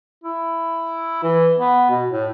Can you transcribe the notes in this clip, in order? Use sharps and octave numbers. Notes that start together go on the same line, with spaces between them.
E4
E3
B3
B2
A2